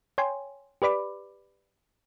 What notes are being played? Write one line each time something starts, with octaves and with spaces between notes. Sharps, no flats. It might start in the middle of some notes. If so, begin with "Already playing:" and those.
C#5 G5 G#5 C6
G4 B4 D5 B5 D6